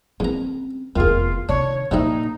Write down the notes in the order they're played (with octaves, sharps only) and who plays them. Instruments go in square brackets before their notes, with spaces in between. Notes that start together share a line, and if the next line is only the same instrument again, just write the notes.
[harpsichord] E2 A#5 [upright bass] C4 C#4
[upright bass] F1 E2 [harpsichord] D#3 G#4 [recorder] F4
[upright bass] C3 D#3 [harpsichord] D4 [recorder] C#5
[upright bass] A#2 [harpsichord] F3 G3 E4 [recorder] D#4